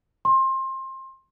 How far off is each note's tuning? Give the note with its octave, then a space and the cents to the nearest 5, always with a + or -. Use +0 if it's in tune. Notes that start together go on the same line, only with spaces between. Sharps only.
C6 +25